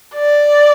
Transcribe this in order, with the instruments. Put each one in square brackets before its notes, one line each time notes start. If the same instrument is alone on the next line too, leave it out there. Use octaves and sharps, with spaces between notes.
[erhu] D5